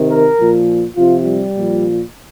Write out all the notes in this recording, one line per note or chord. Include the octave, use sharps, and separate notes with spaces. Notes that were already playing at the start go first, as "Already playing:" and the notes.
Already playing: C3 D#3
A#4
A#2 F3
C3 F3 F4
G3
A#2 F3